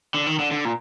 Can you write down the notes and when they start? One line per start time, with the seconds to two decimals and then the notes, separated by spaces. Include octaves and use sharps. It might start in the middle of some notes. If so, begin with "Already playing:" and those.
0.14 D3
0.26 D#3
0.39 D3
0.51 D3
0.65 A#2